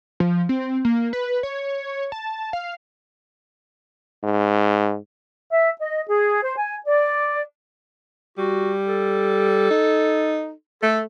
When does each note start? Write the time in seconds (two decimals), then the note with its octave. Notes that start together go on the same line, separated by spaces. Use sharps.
0.20 F3
0.49 C4
0.85 A#3
1.13 B4
1.43 C#5
2.12 A5
2.53 F5
4.23 G#2
5.52 E5
5.80 D#5
6.08 G#4
6.43 C5
6.57 G#5
6.86 D5
8.38 G3 F#4
8.87 A4
9.71 D#4
10.83 A3 A4